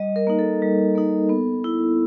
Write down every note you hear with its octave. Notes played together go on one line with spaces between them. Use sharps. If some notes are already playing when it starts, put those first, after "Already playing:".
Already playing: G3 D#5
A#4
A#3 D#4
A4
G3
A#3 D#4
B3
E4